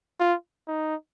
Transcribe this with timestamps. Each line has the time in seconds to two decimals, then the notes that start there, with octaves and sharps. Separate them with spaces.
0.20 F4
0.67 D#4